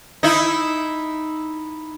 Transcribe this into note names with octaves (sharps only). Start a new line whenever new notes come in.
D#4 E4